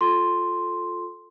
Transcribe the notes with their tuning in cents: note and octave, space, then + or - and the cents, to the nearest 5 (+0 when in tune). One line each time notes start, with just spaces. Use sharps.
F4 +15 A4 +0 C6 +0